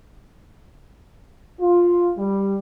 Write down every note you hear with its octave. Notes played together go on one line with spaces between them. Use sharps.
F4
G3